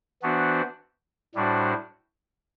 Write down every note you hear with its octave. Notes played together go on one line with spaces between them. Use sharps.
E3 B3 D4 F#4 C5
A2 G3 D4 F#4 C5